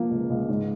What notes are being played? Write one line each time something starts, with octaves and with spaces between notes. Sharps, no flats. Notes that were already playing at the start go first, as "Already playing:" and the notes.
Already playing: F3 A#3
C#2
C#2
G#2